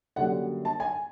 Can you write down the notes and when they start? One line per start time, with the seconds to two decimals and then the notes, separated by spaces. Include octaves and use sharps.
0.16 F#2 D3 G3 A#3 F#5
0.65 A5
0.80 G#5